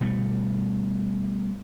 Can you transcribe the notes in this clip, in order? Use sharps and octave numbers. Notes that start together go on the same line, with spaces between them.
B2 G3 A3